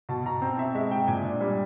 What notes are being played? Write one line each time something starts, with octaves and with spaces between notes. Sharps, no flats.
B2 A5
B2 A#5
C4 A#5
C4 E5
G#3 E5
G#3 G5
A#2 G#5
D4
G3